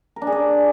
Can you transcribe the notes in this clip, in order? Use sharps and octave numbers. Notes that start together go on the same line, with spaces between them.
A#4
D4
G#4
D5